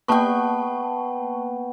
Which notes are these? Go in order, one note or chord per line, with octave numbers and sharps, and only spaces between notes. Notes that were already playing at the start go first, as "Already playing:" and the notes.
A#3 B3 G5 A5 C#6